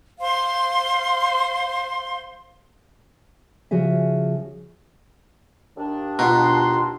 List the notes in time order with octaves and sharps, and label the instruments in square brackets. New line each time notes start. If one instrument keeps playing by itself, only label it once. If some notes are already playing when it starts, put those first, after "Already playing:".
[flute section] C5 F5 C6
[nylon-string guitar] C#3 F3 F#4 G#4 E5
[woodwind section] D#2 D4
[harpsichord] B2 [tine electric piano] F4 A#5 [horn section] C6